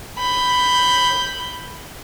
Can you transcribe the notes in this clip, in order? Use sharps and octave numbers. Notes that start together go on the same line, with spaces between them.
B5 G6